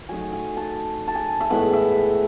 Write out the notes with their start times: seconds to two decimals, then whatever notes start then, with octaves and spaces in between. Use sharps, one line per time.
0.09 F#3 A3 D#4 G#5
0.33 G#5
0.57 A5
1.08 A5
1.15 G#5
1.41 E5
1.50 A2 E3 G#3 B3 F#5
1.73 E5